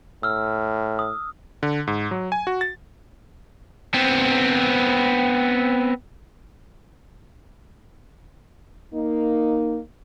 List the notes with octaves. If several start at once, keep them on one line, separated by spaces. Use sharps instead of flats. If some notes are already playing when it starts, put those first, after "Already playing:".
A2 E6 F6
D#6
D3
G#2
F#3
G#5
F#4
A6
B3 C4
A#3 D#4